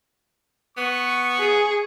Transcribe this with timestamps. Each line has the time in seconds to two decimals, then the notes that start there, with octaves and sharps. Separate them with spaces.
0.77 B3 C#6
1.39 G#4